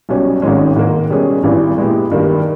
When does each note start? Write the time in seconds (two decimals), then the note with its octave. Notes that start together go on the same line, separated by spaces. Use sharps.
0.09 B1 B2 G3 C#4
0.42 G#1 G#2 D#3 G#3 C#4
0.76 G#2 D#3 A#3
1.10 B2 G3 C#4 G#4
1.43 G#1 G2 E3
1.77 A#2 G#3 B3 E4 G4
2.11 G2 D#3 A#3